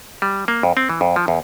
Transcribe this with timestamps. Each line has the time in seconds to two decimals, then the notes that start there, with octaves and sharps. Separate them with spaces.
0.22 G3
0.48 A#3
0.63 F2
0.77 C4
0.89 E3
1.01 F2
1.16 F3
1.28 E2